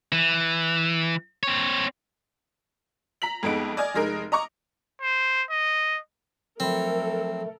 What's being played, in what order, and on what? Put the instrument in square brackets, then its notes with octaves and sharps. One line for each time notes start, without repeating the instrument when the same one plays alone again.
[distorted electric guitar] E3
C4 C#5
[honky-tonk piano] A#5 B6 F#7
F2 G#3 A3 B3 D#4 D7
D5 D#5 G#5 F6 G#6
F1 G#3 D#4 A#4
D#5 A#5 C#6 D6
[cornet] C5
D#5
[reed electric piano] F3 F#3 B5 [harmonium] A3 [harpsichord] C4 [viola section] A4 A#4